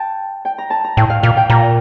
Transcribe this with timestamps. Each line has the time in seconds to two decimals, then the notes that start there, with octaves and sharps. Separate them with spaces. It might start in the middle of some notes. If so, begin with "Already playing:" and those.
Already playing: G5 A5
0.45 G5
0.58 A#5
0.70 A5
0.84 A#5
0.97 A2 G5
1.10 F5
1.23 A#2 F5
1.37 G5
1.50 A#2 A#5